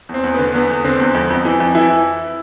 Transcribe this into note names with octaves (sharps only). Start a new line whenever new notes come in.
E2
C4
E2
D3 B3
E2 B3
E2
D3 C4
E2
F2
F2
E3
F2
E3 E4